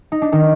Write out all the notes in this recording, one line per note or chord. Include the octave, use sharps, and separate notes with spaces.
D#4
D4
D#3 D#4